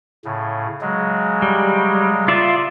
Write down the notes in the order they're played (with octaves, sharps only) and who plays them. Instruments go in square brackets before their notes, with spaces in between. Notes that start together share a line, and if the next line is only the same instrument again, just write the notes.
[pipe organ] A2 C#3
C#3 F#3 G#3
[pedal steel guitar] G3
F4 D5 E5